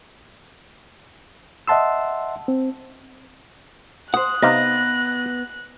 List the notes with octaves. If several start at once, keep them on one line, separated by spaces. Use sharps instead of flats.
D#5 E5 F#5 A5 C6 E6
C4
C5 F#5 D#6 F#6
C3 B3 D#4 F5 A#6